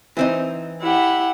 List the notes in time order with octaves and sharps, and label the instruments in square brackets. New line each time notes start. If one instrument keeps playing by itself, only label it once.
[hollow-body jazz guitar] E3 C4 D#4
[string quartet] E4 G4 F#5